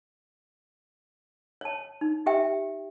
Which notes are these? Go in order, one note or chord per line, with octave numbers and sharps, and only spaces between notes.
C#5 A5
D#4
G4 E5 G5